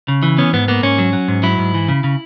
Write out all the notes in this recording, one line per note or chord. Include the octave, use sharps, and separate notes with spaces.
C#3
E3
B3 C#4
G#2 B3
A#3 B3
G#2 C#4
F#3
F#3
G#2
F#3 E4
G#2
E3
C#3
C#3